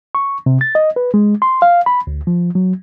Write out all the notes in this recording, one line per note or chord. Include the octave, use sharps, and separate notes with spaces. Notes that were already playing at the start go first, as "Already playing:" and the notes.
C#6
C3
A6
D#5
B4
G#3
C6
F5
B5
D2
F3
F#3